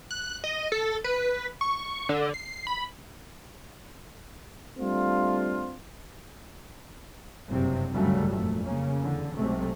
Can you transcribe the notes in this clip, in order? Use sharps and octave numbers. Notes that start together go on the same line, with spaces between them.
F#6
D#5
A4
B4
C#6
D3
C7
B5
G3 A3 C4 D4 F4
F#1 G2 C3 F#3 C4
D2 G2 C#3 F#3 G3 A3
F1 A#2 A3
C#3 A#3 C#4
E2 D3
B1 C3 G#3 A3 C4